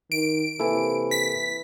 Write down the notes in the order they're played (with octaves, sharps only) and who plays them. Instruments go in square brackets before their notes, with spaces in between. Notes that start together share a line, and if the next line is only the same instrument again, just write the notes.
[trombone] D#3 [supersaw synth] D7
[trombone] C3 [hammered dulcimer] E3 [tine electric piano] A#3 E4 A4
[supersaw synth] B6